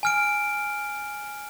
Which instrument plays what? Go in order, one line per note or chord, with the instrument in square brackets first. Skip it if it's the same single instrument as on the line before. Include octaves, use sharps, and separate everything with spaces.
[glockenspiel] G#5 F6 D7